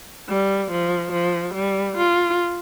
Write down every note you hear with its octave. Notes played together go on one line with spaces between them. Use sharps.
G3
F3
F3
G3
F4